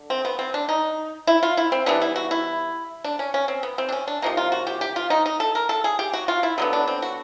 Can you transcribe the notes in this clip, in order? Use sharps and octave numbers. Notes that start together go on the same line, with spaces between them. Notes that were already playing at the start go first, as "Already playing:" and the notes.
Already playing: D3
C4
B3
C4
D4
D#4
E4
F4
E4
C4
E3 G3 B3 D4
E4
F#4
E4
D4
C#4
C#4
C4
B3
C4
D4
C#4
D4
C3 F3 A#3 D#4
F4
F#4
G4
G4
F4
D#4
D#4
A4
A#4
A4
G#4
G4
F#4
F4
E4
D3 F#3 B3 D#4
D4
C4
F#4